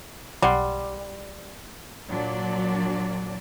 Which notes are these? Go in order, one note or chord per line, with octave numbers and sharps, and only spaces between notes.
B1 G3 F#5 C6
A#2 F#3 D4 D5